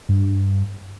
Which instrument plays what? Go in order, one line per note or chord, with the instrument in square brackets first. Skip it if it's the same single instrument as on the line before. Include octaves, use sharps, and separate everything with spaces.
[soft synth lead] G2